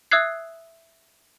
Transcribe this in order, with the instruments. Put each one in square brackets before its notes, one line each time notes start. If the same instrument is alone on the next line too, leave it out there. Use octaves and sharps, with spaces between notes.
[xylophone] E5 D#6 E6 F#6 G#6 C7